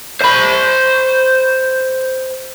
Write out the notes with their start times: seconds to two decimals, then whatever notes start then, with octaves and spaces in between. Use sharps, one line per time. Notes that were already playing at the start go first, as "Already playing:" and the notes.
0.22 C5 B5